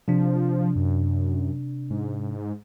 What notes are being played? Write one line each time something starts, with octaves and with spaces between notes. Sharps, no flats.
C3 F3 D4
F#2
G#2